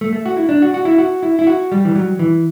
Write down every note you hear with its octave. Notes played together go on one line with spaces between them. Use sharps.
A3
A3
F#4
E4
D4
F#4
F#4
E4
F#4
E4
E4
F#4
G3
E3
F#3
E3